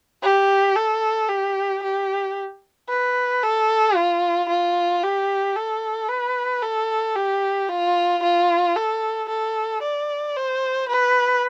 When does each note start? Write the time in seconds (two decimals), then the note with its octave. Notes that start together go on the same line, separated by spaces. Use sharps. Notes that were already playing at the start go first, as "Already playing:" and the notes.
0.23 G4
0.76 A4
1.29 G4
1.83 G4
2.88 B4
3.43 A4
3.95 F4
4.49 F4
5.03 G4
5.55 A4
6.08 B4
6.62 A4
7.16 G4
7.68 F4
8.23 F4
8.76 A4
9.29 A4
9.82 D5
10.36 C5
10.88 B4